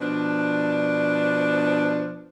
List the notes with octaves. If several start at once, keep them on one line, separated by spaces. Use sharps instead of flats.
B2 F3 D4